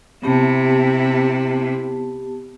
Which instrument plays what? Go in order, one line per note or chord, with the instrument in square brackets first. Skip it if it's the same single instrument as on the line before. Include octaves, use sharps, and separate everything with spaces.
[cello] C3 E4 [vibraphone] B3 G4 A5